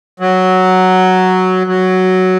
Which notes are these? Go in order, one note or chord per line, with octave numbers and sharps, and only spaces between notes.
F#3
F#3